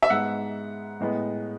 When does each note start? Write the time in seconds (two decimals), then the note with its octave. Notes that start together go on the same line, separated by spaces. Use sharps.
0.02 E5
0.10 G#2 G#3 B3 F#5
1.00 A2 G#3 B3